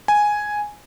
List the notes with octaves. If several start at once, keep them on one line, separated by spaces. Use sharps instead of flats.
G#5